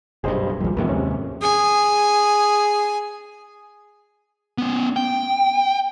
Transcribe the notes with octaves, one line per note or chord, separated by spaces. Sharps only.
F#1 B1 G2 G#4 C5 D#5
A#1 D#2 G#2 F3 G3
D#2 G#2 C3 F3 A#3 B4
C#4
G#4 G#5
B3 C#4
G5